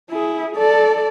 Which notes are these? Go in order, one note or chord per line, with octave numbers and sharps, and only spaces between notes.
E4 G#4
A4 D5